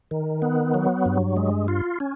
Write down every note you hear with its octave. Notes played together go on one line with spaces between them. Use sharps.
D#3
B3
F#3
G2
G#3
F4
C#4